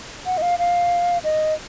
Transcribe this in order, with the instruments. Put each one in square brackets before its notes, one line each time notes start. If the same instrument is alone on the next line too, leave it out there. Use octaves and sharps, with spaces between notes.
[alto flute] F#5
D#5
F5
F5
D#5